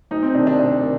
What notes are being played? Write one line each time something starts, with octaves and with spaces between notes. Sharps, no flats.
D2 D#4
C4
C3 D#3 D4
D4
D2 D4
D#3